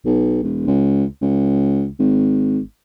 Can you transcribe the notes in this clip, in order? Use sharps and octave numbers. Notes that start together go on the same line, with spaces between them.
B1
E1
C#2
C#2
G#1